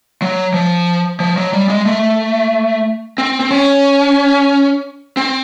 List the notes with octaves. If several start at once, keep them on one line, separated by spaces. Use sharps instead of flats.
F#3
F3
F3
F#3
G3
G#3
A3
C4
C4
C#4
C4